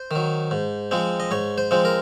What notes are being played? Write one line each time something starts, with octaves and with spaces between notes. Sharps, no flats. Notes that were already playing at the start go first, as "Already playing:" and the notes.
Already playing: C5
D#3 F#3
G#2
F3 G#3 C4
D#5
G#2 C#5
C5
F3 G#3 C4
A#4